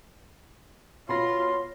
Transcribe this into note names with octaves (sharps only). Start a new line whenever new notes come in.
B2 F4 C#5 B5 C6 A#6